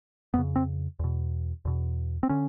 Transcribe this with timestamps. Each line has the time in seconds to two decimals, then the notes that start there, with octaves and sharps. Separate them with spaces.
0.34 F2 C#3 B3
0.56 C4
0.99 E2 B2
1.65 E2 B2
2.23 C4
2.29 D3 C#4